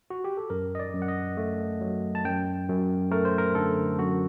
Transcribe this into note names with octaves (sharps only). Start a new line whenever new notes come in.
F#4
G4
A4
F#2 A#4
D#5
D5
F#2
F#5
D#5
A3
F#3
A5
F#2 G5
F#2
A3 A#4
C5
A#4
D3 A4
F#2 F#4